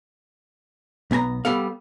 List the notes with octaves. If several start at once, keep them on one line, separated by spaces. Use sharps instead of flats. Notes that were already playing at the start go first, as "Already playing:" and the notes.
B1 B3 G#5 A#5
G3 B3 A4 F5